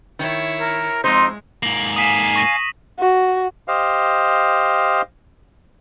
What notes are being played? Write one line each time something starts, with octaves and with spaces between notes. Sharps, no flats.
D#3 E4 C#5
A#4
F2 G#3 D#4 C5
G#2 A#3 F#7
F5 G#5 D#6 B6 E7
C#6 A#6 D#7
F#4
G4 C5 D#5 F5